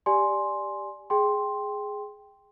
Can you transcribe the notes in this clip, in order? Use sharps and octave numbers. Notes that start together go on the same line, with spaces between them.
G4 D5 G#5 C6
G#4 G5 C6